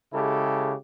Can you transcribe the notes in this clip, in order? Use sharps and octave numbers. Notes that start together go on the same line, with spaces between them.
C#3 G#3 E4 G4 A4